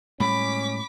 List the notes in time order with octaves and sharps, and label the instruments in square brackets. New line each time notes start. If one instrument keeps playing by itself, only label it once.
[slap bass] A2 G3 G#3 [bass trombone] C#4 [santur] B5 [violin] D6 B6